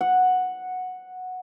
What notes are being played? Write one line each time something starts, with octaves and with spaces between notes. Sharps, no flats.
F#5